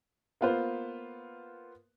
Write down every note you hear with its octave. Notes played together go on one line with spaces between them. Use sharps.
A#3 B3 F4 B4 C5